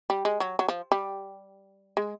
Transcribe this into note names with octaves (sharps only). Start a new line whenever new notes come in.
G3
G#3
F#3
F#3
F3
G3
G#3